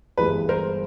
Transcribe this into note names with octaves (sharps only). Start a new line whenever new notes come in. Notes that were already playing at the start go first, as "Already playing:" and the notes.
G1 G2 E3 G#3 B4
A#4 C5